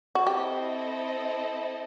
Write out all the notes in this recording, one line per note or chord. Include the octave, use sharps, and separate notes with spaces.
F#4
C4 E4 G4 A4 C5 D#5